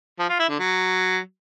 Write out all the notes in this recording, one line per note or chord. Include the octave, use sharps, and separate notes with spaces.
F3
F4
E4
D3
F#3